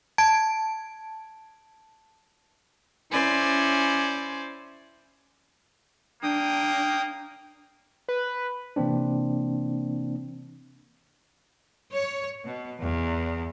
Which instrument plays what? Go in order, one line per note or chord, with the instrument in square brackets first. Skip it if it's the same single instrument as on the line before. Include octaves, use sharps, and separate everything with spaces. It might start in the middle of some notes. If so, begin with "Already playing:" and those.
[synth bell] A5 G#6 D7
[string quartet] C#4 E4 C5 D5 G#5
[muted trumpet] A#3 [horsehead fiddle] D4 [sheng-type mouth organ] G5 D#6
[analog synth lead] B4
[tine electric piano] C3 E3 A#3 C4 D4
[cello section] C#5
B2
E2